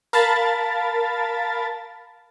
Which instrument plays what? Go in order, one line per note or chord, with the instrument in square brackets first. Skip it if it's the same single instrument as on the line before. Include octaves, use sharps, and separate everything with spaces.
[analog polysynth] A#4 F5 A5 B5 A6